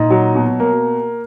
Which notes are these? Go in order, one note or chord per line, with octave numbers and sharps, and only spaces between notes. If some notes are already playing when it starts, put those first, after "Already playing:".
Already playing: A#2 D#4
F#3
B2
A#3